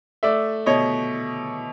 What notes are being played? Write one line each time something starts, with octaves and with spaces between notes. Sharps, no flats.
A3 D5 E5
B2 C#5 D#5